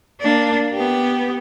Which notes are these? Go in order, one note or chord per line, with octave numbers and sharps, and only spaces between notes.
A#3 D4
B3 G4